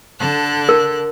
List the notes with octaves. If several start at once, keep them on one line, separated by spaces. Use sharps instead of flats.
D3 A4 F#6
A#4